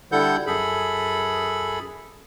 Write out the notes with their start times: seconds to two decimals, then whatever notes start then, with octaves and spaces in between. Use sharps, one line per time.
0.12 D3 G3 E4 A4 F#5 G6
0.47 F#2 G#4 A4 B5